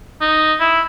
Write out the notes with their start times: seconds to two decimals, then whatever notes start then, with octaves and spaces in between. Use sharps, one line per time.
0.21 D#4
0.60 E4